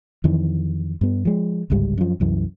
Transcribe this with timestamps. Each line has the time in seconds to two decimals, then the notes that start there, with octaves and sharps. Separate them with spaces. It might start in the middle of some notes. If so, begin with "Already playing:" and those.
0.24 F2 D#3 E3
1.01 G2 B3
1.25 F3 G#3
1.70 G1 C#2 G#2 G3
1.98 F#2 F3
2.20 C2 F#2 E3